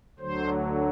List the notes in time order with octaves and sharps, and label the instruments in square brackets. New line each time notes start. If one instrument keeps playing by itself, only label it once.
[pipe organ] D2 D3 F#3 C5